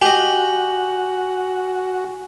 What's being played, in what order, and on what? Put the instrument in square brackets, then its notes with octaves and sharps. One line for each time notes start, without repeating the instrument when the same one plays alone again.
[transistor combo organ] F#4 [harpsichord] G4 D#5 [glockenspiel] G#5 F#7